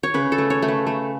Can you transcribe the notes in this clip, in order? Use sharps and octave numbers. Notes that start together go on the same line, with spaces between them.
C#5
C#3 B4
A4
A3
C#5
A3
B4
A3